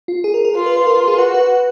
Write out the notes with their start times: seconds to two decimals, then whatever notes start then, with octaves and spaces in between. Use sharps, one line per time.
0.08 F4
0.24 G#4
0.34 A#4
0.45 A#4
0.55 F4 A#4
0.66 B4
0.77 B4
0.87 F4 A#4
0.97 A#4
1.08 G#4
1.18 F#4 B4
1.34 B4